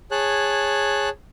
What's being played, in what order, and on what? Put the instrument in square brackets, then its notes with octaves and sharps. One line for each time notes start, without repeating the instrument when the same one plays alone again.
[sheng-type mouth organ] G#4 C#5 A5 F#6